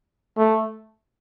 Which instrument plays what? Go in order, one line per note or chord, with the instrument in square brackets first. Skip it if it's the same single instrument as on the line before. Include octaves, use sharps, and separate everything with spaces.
[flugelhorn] A3